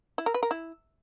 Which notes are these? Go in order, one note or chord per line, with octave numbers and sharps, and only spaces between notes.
E4
A#4
B4
A#4
E4